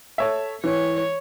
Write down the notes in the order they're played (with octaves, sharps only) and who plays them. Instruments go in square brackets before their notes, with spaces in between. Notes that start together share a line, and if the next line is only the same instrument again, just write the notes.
[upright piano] A4 C#5 E5
[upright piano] E3 [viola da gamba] C#5